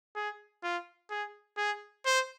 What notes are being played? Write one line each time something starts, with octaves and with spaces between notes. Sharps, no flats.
G#4
F4
G#4
G#4
C5